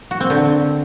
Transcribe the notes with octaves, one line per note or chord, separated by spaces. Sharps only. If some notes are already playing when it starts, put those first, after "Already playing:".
F#4
C4
D3